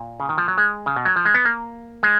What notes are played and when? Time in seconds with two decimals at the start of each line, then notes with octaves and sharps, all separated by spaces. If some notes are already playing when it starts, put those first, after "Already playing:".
Already playing: A#2
0.20 C#3
0.29 D#3
0.38 F3
0.48 F#3
0.58 G#3
0.86 C#3
0.96 B2
1.05 F#3
1.16 F3
1.25 G#3
1.34 B3
1.45 A#3
2.03 G#3